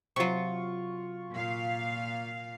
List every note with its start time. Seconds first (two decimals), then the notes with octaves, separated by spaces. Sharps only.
0.16 C3 F#3 F4 C#6
1.34 A#2 F5